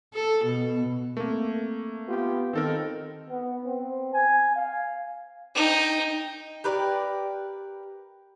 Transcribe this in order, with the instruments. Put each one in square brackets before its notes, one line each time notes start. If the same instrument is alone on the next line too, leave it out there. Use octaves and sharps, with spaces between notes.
[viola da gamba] A4
B2
[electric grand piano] A3 A#3 [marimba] C4 A#4
[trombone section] B3 F4 G4
[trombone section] D#3 [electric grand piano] C4 A4 A#4
[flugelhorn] B3
C4
G#5
F5
[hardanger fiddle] D#4 G5
[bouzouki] G4 A#4 B4 D5